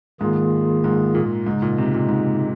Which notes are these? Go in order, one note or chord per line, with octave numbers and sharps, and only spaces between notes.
G#2 D#3 A#3 F4 G#4
G#2
A#2
G#2 C#3 G#3 D#4
A#2
C3
A#2
G#2